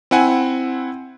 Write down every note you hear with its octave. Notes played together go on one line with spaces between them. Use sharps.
C4 E4 F#5 G#5